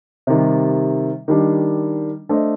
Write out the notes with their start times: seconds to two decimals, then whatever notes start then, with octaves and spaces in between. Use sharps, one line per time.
0.27 C3 D#3 G3
1.28 D#3 G3 D4
2.29 A3 D4 A4 C5 D#5